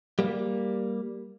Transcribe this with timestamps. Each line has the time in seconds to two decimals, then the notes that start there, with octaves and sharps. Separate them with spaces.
0.19 G3 A#3